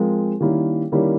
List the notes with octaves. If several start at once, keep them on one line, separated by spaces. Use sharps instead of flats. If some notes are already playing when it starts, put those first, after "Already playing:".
Already playing: F3 G#3 C4 F4 A#4
D#3 G3 A#3 C#4 E4
D#3 G3 A#3 C#4 E4